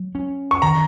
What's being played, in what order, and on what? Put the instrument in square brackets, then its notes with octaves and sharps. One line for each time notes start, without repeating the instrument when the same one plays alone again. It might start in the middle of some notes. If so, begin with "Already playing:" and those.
Already playing: [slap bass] F#3
C#4
[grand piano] C#6
[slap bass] D#3 [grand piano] A#5